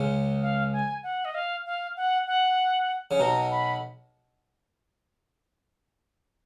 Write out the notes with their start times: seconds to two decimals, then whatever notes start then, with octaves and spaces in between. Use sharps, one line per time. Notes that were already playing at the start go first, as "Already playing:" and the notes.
Already playing: C#2 C#3
0.42 F5
0.73 G#5
1.03 F#5
1.25 D#5
1.35 F5
1.66 F5
1.97 F#5
2.27 F#5
3.11 C#3
3.19 B1 B2 A#5
3.51 B5